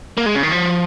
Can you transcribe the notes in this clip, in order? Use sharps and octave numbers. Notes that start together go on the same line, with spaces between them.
A#3
G#3
C#3
D#3
F3